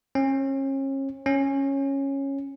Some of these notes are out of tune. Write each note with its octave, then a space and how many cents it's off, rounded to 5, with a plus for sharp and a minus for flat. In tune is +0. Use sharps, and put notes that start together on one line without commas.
C#4 -35
C#4 -10